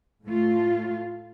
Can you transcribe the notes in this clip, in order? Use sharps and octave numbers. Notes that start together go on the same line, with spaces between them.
A2 A3 F4